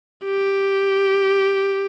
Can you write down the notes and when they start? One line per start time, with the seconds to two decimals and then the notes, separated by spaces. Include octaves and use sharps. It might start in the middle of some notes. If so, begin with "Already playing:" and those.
0.25 G4